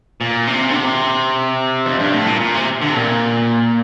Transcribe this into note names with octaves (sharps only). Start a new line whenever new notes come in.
A#2
C3
D3
C3
F2
G2
A2
A#2
A#2
C3
D3
C3
A#2